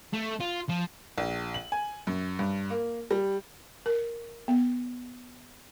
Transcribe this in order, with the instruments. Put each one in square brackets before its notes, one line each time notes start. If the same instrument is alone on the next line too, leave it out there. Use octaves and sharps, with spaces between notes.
[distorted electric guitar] A3
F4
F3
[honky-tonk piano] A#1
F#7
G#5
F#2
G2
A#3
G3
[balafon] A#4
B3